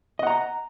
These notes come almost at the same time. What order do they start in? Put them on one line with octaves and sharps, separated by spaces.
D#5 F#5 A#5